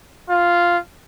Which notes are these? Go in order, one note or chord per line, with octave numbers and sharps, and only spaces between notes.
F4